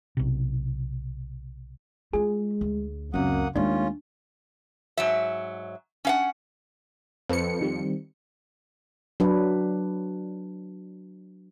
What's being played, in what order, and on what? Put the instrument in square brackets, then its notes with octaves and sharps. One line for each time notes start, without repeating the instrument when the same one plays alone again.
[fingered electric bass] B1 C3
[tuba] G#3 [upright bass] E4 F4 [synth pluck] G#4
[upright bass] D2
[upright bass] C#2 C4 [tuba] F#2 [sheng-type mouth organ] A#3 F#5 D#6
[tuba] D#2 [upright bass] G#3 A3 [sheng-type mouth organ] C#4 F4 [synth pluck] D4
[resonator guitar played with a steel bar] G#2 F#3 E5
C#4 F5 F#5
[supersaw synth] F2 C#7 [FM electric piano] C4 A4 B4
[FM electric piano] D#3 G3 C4
[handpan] F#3 D4 B4